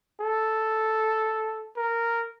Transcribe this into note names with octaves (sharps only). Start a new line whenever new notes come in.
A4
A#4